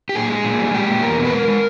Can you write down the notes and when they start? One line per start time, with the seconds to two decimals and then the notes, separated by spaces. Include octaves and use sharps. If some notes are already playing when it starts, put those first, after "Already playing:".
0.09 G4
0.15 A#2 G#4
0.30 G#3
0.45 A#2
0.59 G3
0.74 G#3 G4
0.89 A#2
1.03 E2 A#4
1.18 B2
1.25 B4
1.33 G#3 A#4
1.48 G#3